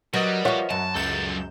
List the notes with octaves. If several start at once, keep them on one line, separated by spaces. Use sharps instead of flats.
F#3 G3 A#4 B4 D#5
F3 F#4 C#5 E5 F#5
F#2 A5
C#2 F#3 A4 G6 E7